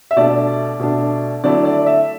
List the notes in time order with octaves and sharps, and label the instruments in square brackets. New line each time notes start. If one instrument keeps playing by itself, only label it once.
[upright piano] E5
B2 A3 D4 D5
B2 A3 D4
D3 F#3 A3 E4 D5
D5
E5